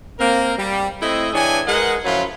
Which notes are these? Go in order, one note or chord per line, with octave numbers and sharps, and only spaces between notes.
A#3 C4 A#4
G3
A3 C4 E4 D#5
E3 D4 G#4 C#5 G5 G#5
G#3 A#4 B4 D#5 F#5
F#2 F3 F#3 E4 F4 B5